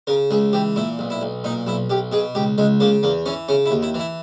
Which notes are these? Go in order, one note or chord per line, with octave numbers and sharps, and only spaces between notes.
C#3 A#4
C#2 G#4
E3 G4
A#2 E4
B1
E4
B1
A#2 D#4
B1 E4
B1 G4
B2 G#4
C#2 G4
C#2 G#3
C#3 A#3
E2 A#3
E3 C#4
C#3 C#4
E4
D#2
E4
E3
E4